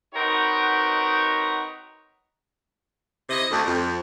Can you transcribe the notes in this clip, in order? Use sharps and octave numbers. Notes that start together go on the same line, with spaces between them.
C4 D#4 F#4 A#4 B4 C#5
C3 E4 D#5
D2
F2